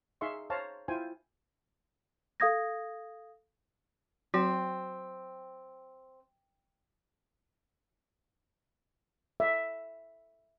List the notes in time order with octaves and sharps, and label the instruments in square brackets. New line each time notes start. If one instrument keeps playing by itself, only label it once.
[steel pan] D#4 G#4 E5 F5 C6 C#6
C5 C#5 F5 A5 A#5
E4 F4 C5 G5 G#5
[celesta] A4 F5 D#6 G#6 A#6
[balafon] F#3 [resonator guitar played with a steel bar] C4 [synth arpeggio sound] F#4
[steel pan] E5